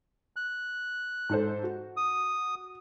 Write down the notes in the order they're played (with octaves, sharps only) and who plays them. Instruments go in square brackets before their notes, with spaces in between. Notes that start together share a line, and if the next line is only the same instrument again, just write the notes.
[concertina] F#6
[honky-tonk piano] G#2 A4 C5
F#4
[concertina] D#6